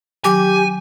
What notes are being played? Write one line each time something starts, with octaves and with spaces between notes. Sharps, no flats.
D#3 F#3 G4 G#5 D6